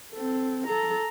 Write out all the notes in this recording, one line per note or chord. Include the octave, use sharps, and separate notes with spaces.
C4 A4
A4 A#5